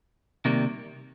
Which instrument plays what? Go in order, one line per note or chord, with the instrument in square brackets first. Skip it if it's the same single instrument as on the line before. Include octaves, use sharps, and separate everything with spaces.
[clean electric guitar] C3 D#3 G3 A#3